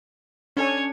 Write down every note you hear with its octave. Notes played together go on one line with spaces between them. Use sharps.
C#4 D4 A4 C#5 G#5